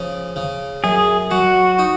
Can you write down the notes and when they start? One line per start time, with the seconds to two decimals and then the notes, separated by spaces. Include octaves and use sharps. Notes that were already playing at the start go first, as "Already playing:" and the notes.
Already playing: C#3 F3
0.36 C#3
0.84 F#2 G#4
1.31 F#3 F#4
1.79 D#4